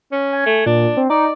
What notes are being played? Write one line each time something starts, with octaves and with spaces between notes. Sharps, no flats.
C#4
G#5
A3
A#2 D4
C4
D#4 D5